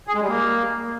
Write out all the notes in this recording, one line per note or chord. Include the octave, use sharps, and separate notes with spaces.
G#4
G#3
G3
A#3